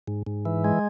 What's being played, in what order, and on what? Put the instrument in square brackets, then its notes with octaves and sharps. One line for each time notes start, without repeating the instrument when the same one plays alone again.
[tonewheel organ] G#2
G#2
E3
G#3